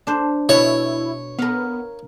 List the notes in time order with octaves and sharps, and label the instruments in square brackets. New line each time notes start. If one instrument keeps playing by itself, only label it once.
[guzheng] D4 C5
[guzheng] B2 [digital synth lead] E4 [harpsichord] C#5
[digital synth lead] B3 [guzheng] A#4 F5